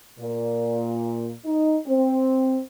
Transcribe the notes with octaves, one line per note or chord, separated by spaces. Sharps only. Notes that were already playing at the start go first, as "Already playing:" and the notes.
A#2
D#4
C4